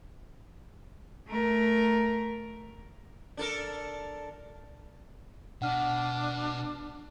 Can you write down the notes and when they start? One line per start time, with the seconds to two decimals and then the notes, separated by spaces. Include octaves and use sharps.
1.27 A3 A#4
3.37 D4 A4 A#4
5.62 B2 D4 F#5 F6